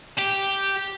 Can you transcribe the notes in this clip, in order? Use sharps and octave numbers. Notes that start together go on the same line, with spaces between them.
G4